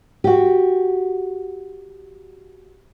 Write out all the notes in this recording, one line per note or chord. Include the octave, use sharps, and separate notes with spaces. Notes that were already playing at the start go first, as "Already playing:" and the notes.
F#4 G4